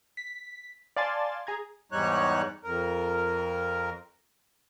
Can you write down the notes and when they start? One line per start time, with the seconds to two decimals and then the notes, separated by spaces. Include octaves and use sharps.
0.17 B6
0.96 D5 F5 G#5 A5 C6 A6
1.47 G#4 A#5 G#6
1.92 E2 G#2 G3 D#4 C#5 F#6
2.64 F2 A#4